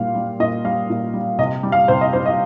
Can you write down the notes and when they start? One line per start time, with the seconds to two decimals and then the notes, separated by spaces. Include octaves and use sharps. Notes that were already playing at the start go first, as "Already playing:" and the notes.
Already playing: A#2 G3 F5
0.15 G3
0.40 A#2 D#5
0.64 G3 F5
0.90 A#2
1.14 G3
1.39 C3 D#5
1.63 G3
1.72 F5
1.88 C3 C5
2.01 D#5
2.13 G3 C5
2.26 D#5